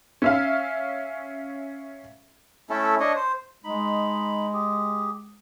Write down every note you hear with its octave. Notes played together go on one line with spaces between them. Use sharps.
C#4 E5 F5
A3 C#4 E4 A4
D4 C#5 D#5
C5
G#3 D#4 B5
G4 G#4